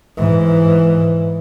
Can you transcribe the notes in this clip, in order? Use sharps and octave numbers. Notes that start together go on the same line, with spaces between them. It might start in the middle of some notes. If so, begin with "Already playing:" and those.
G#2 E3